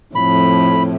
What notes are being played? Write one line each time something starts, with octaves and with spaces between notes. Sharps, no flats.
F2 A2 B5